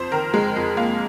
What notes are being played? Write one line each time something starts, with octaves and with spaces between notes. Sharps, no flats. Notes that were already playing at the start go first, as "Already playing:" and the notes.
Already playing: F2 C5
D#3 A#4
G#3
F2
A#3